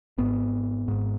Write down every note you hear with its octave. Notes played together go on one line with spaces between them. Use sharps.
G#1 G#2 B3
G#1 G#2